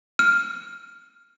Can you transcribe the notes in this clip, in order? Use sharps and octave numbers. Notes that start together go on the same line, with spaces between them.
F6